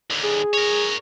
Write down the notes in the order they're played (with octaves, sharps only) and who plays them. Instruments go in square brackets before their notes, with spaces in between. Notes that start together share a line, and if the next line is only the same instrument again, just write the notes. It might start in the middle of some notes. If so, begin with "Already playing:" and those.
[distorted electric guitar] D#2 D3
[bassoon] G#4
[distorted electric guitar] A#4 C#5